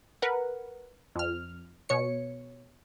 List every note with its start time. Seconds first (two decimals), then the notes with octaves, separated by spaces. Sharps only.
0.22 A#4 B4 F#5
1.16 F2 F6
1.89 B2 C#5 C#7